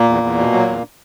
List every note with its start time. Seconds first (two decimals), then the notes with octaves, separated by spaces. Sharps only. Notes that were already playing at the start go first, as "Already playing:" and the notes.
Already playing: A#2 A#3
0.09 E2
0.23 E2
0.38 B2
0.53 F#3
0.68 E2